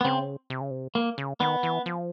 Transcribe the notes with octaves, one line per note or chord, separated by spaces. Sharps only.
B3
C#3 C4
C3
C#3
C3
A#3
C#3
D#3 B3
E3
F3